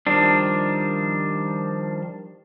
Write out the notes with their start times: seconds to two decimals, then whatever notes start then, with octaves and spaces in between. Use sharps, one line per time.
0.07 D#3 F3 G3 D4